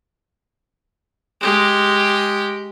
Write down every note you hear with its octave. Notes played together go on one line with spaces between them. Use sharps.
G#3 G4